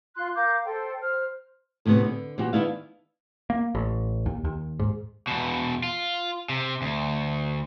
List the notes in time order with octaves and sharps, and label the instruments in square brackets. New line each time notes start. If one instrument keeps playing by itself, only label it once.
[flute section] F4 C6 F#6
A#4 F5 D6 G6
A4 C5 G5
C5 F6
[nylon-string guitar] D2 A2 C3 B3
D3
A#2 E3 F#4 G4
D#3 B3 D4 E4 D5 F5
[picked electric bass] A#3
A1
D#2
D#2
G#2
[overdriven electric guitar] E2 B2
F4
C3
D2